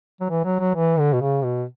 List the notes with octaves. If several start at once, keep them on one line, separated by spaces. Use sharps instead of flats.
F#3
E3
F#3
F#3
E3
D3
B2
C#3
B2